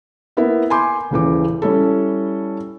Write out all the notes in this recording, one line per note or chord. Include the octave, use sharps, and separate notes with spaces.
A#3 B3 E4 A#4 E5
G#5 B5 C6 D6 G6
D#1 C#3 E3 D6
G3 C#4 E4 A4